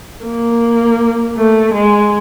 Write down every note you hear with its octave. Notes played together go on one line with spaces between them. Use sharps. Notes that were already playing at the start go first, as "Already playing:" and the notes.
A#3
A3
G#3